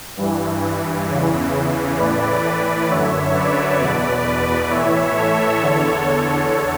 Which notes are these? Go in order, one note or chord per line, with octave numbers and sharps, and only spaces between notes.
G2 E3
E2 C#3 E3
A2 E3 B4 D5
B4 D5
F#2 D3 C#5 E5
B4 D5
E2 B2 B4 D5
B4 D5
A2 E3 C#5 E5
A4 C#5
E2 D3